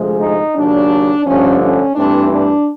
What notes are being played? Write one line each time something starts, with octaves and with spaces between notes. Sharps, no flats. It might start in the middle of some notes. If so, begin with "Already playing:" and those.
Already playing: D2 C3 F3 G#3
D#4
D#2 C#3 F#3 D4
G2 D3 F3 A3 C#4
C#4
G2 E3 A3 C4 D4
D4